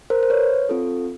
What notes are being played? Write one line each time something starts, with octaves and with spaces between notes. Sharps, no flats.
A#4 C5
C5
B4 C#5
C4 F4 A4